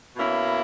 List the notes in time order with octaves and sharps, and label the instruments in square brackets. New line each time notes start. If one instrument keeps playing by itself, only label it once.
[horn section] B2 A#3 C#4 E4